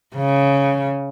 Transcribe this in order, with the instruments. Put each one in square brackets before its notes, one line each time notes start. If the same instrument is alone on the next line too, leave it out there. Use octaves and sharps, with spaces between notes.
[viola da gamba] C#3